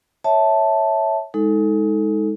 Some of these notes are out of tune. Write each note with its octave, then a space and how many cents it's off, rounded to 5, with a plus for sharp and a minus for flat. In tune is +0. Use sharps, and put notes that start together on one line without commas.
C#5 +0 E5 -15 A5 +0
G#3 +0 D#4 +25 A4 +0